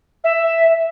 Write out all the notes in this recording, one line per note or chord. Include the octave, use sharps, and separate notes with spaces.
E5